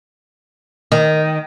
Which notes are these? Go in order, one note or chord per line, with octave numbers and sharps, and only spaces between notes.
D#3